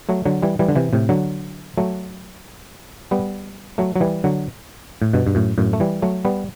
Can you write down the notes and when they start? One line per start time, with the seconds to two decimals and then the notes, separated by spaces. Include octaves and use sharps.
0.09 F#3 A3
0.25 D3 F#3
0.42 E3 G3
0.59 E3 G3
0.69 D3
0.76 C3 E3
0.93 A2 C3
1.09 D3 F#3
1.78 F#3 A3
3.11 G3 B3
3.78 F#3 A3
3.96 F#3
4.00 E3 G3
4.24 D3 F#3
5.02 A2
5.13 G2 B2
5.27 G2
5.35 F#2 A2
5.58 F#2 A2
5.73 A3
5.80 E3 G3
6.02 F#3 A3
6.25 G3 B3